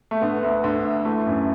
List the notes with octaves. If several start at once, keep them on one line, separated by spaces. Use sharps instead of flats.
A3
D3 B3
D2
D3
D2
E3 A3
F#2